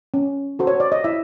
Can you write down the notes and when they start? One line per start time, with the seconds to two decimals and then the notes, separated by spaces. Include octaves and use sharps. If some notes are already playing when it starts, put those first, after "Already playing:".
0.14 C#4
0.59 F#4 A4 C5
0.67 C#5
0.80 D5
0.92 D#5
1.04 E4 E5